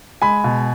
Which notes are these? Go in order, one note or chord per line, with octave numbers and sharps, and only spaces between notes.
G#3 G#5 B5
B2